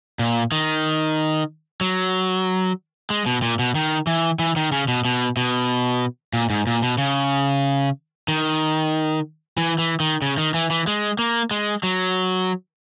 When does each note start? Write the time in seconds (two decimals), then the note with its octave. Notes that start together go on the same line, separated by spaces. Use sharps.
0.19 A#2
0.52 D#3
1.81 F#3
3.10 G#3
3.26 B2
3.42 A#2
3.59 B2
3.75 D#3
4.07 E3
4.39 E3
4.56 D#3
4.72 C#3
4.88 B2
5.05 B2
5.37 B2
6.33 A#2
6.50 G#2
6.67 A#2
6.82 B2
6.98 C#3
8.28 D#3
9.58 E3
9.78 E3
10.00 D#3
10.22 C#3
10.38 D#3
10.54 E3
10.70 E3
10.87 G#3
11.19 A#3
11.51 G#3
11.83 F#3